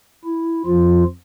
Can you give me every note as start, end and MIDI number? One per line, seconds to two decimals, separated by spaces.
0.24 0.62 64
0.66 1.04 41
0.66 1.04 53
0.66 1.04 65